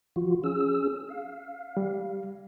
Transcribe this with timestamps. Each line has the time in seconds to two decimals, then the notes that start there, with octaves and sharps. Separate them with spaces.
0.16 F3 F4 F#4
0.44 C#4 G#4 E6
1.09 F5
1.77 G3